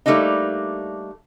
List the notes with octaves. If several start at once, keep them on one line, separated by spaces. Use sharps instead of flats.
G3 A3 A#3 D4 D#4